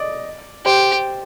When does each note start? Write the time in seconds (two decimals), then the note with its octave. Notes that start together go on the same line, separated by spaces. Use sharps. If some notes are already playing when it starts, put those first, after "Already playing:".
Already playing: D5 D#5
0.65 G4 C5